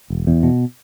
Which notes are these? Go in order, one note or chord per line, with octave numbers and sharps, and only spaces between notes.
E1
E2
B2